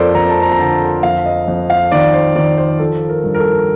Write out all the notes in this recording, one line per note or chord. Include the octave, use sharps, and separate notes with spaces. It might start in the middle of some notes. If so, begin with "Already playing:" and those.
Already playing: F2 F3 A4 A#4 C5 D5
F2 A#5
A5
A#5
A#5
D3 A5
F2 F5
D#5
F2
F5
D#3 D5
C5
D#3 D5
C5
F3 A4
A#4
G2
A#4
A4